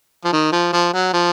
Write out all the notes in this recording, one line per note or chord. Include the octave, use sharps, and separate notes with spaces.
F3
D#3
F3
F3
F#3
F3